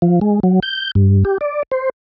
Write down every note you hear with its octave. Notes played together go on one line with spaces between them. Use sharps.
F3
G#3
F#3
G6
G2
G4
D5
C5